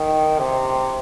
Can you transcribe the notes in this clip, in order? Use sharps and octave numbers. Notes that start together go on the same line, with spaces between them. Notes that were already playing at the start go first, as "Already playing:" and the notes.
Already playing: D#3
C3